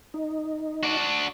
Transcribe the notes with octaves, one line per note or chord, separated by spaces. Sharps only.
D#4
D4 F#4